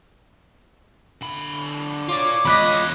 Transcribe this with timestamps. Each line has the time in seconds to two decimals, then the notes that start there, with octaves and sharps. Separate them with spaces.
1.21 D3 B5
2.09 F4 C#5 D5 D6
2.45 E2 G#3 F4 D#5 B5 F#6 B6